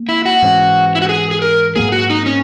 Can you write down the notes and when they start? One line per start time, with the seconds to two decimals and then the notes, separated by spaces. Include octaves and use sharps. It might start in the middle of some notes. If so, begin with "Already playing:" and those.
Already playing: A#3
0.09 E4
0.25 F#4
0.42 G#2 E3 G#3 C#4
0.95 E4
1.02 F#4
1.09 G#4
1.31 G#4
1.42 A#4
1.76 G#2 F#3 A#3 G#4
1.92 F#4
2.10 D#4
2.26 C#4